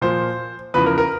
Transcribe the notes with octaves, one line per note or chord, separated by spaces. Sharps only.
A#2 F3 C5
E2 C#3 F3 B4
A#4
A#4